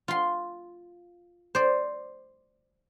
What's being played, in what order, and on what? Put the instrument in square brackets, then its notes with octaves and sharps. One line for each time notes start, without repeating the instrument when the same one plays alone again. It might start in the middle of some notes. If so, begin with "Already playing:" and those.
[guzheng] F4 C6
C5 D5